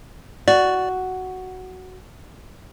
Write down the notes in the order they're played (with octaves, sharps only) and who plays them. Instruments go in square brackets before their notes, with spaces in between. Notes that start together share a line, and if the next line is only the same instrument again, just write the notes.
[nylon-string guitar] F#4 [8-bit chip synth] D5